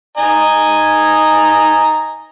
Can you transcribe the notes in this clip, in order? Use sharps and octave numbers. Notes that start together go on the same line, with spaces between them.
D#5 G#5 A#5